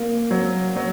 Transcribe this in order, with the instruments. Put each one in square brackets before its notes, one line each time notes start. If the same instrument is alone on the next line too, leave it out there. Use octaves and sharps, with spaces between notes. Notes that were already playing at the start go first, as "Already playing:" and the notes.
Already playing: [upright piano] A#3
F#3
F#3